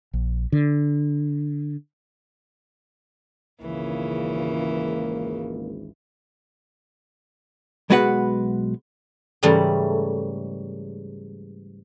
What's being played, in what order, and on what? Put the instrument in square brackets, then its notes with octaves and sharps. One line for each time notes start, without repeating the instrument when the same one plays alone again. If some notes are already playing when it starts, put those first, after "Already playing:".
[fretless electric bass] A#1
D3
[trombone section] G#1 C#2 [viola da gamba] C#3 E3 [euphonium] A#3
[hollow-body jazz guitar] B1 G#3 B3 F#4 B4 F#5
[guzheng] G#2 C#3 E3 G3 A3